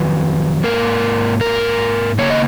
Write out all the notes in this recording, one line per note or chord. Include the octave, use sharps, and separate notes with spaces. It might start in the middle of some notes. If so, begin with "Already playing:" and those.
Already playing: F2 D#3 F#3 B4
G#2 D#3 A#3 A#4
A#4
C#3 F3 A#3 C#5
D#5